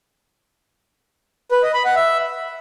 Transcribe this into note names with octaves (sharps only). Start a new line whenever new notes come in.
B4
D#5
B5
F#5
E5